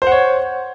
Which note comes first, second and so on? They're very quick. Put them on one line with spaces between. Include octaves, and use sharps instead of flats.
C5 F#5 C#5